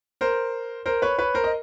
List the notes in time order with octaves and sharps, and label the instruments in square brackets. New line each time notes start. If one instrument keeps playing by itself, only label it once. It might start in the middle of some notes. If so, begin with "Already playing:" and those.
[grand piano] A#4 C5
A#4 C5
B4 C#5
B4 C#5
A#4 C5
D#5